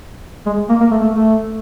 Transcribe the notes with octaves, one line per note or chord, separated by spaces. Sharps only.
G#3
A#3
A#3
A3
A3
A3